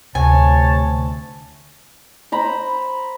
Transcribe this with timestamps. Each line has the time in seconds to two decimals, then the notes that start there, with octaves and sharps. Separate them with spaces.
0.15 D2 C3 C#5 G#5 A5
2.32 C5 A#5 B5